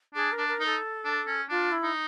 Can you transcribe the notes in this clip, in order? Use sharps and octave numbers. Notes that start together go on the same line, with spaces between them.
D4 G#4
A#4
D4
A#4
D#4
A4
D4
C#4
D4 F4
E4
D#4